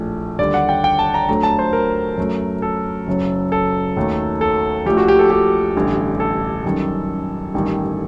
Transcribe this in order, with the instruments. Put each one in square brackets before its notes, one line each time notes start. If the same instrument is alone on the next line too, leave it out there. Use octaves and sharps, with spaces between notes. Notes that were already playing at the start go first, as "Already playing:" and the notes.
Already playing: [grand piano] A#1 A2 A3
D#2 D3 G3 D5
F#5
G5
G5
A5
A#5
D2 D3 F#3 A3 A#5
A5
C5
A#4
F#2 F#3 A3
A4
F#1 F#2 F#3
A4
D#2 D#3 F#3 A3
A4
A#1 A#2 A3 G4
F#4
G4
A4
G4
A1 G2 D3
A4
F#2 D#3 G3
A1 G2 D#3 G3